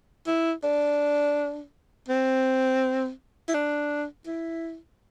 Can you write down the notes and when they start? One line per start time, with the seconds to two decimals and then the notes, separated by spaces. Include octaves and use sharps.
0.27 E4
0.64 D4
2.09 C4
3.49 E4
3.54 D4
4.26 E4